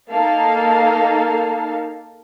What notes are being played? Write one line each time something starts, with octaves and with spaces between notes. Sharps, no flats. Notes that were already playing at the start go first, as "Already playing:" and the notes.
A#3 D#4 A4 F5 A5